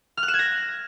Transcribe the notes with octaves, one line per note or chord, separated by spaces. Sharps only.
F6
F#6
E7
G#6
A#6